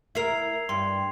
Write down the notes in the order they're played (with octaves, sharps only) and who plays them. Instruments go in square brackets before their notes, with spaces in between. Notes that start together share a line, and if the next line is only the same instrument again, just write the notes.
[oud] E4 A#4 [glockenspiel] G#6 C7 F7
[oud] G2 [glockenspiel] C6